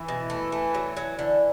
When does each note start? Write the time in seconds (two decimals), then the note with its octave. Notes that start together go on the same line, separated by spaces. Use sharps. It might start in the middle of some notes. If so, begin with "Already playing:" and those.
Already playing: E3
0.08 B2
0.30 A3
0.52 A3
0.74 F#3
0.97 F#3
1.17 D3 E3